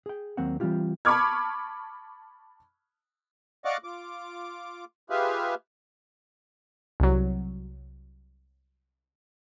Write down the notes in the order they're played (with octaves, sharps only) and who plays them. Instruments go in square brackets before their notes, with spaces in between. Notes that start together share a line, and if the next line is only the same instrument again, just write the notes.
[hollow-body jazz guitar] G#4 G5
D#2 F#3 A#3 C4 F#5
E3 G3 C4 F4 G4
[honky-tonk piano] A5 B5 C#6 D6 F6 G#6
[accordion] D5 D#5 F5 F#5 C#6 D6
F4 D6
F4 G4 G#4 B4 E5 F5
[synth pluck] C2 F#3